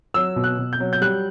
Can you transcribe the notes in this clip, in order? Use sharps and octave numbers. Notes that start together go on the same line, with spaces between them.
F#3 E6
B2
F#6
B2
G6
F#3
G6
G3 F#6